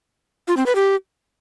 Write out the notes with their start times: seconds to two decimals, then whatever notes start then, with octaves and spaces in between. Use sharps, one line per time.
0.48 F4
0.57 C4
0.66 B4
0.75 G4